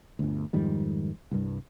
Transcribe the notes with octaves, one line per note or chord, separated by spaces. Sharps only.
G1 D2
F2 G#2 D#3 G3
C2 G2